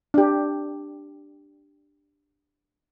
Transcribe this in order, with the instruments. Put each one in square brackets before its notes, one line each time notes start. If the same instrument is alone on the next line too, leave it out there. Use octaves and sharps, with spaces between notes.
[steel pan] D4 G4